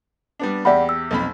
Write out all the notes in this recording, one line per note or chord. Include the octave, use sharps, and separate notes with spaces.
G3 B3 D4
E2 G4 D5 E5 F#5 B5
E6
B1 F2 B5